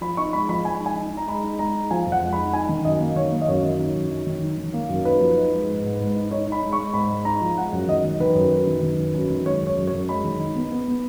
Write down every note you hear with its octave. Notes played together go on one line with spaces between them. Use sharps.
F3 B5
D#4 C#6
G#3 B5
F3 B5
G#3 G#5
D#4
G#5
D#4
D#4
A#5
G#3 B5
D#4
G#3 A#5
D#4
F3 G#5
F2
F#5
G#3
D#4 B5
D#4 G#5
D#3
F#2 D#5
A#3
D#3 C#5
A#3
D#5
F#2 C#5
D#3
D#4
F#2
D#4
D#3
D#4
D#3
A#3
F#2
D#4 B4
F3
D#4
G#3
G#2
G#2
G#2
D#4
D#4 C#5
D#4
B5
G#3
C#6
G#3
G#2 B5
G#3
D#4 A#5
F3
G#3 F#5
F#2
D#3 D#5
D#3
D#3 B4
F#2
F#2
D#3
D#3
F#2
F#2
D#3
G#3 C#5
F#2
C#5
F#2
C#5
F#2
G#3 B5
D#3
D#4
B3
B3
B3